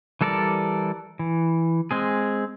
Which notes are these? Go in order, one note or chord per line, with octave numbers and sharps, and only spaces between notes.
E3 G3 A4 A#4 D5
E3
G#3 C4 G#4